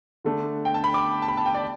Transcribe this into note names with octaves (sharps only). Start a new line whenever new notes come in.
D3 A3 D4
G5
A5
B5
D6
A5
B5
A5
G5
D5